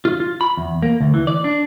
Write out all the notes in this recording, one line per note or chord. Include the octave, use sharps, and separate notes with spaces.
F4
F4
B5
E2
A#3
D2
E3
D5
D4